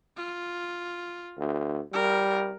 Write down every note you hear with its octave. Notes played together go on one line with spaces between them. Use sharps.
F4
D2
G3 A#4